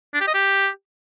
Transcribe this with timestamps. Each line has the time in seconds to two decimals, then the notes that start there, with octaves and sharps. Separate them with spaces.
0.14 D4
0.21 G4
0.28 D#5
0.34 G4